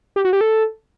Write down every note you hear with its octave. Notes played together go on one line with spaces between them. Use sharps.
G4
F#4
G4
A4